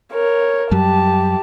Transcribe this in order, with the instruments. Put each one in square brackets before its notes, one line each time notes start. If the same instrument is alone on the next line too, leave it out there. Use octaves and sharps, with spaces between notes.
[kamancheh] A#4 C#5
[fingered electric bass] F#2 F#3 G3 [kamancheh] G4 A5